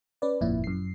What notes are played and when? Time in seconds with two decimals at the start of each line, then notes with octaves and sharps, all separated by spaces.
0.22 C#4 B4 D5
0.41 G1 F2 A#2 E4
0.64 F#2 C7